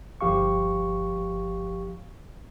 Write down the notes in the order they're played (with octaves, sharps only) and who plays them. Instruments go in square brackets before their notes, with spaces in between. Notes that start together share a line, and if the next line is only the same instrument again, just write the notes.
[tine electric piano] G1 F3 G4 F5 C#6